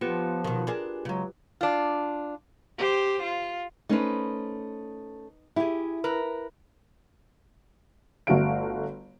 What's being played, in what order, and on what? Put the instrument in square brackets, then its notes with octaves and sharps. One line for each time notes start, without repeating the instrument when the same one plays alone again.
[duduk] F3 [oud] B3 [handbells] F4 G4 B4
[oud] B2 D#3
D4 G#4 A#4
[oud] C#3 G#3 [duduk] F#3
[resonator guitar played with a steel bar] D4 F4
[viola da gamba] G4 C5
F4
[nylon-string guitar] A3 C#4 C5 [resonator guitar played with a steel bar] D#4 B4
[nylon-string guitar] E4 [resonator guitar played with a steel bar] G4 G#4
[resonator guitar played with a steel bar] A#4 B4
[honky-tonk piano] G1 A3 F#4 A4 F5 D7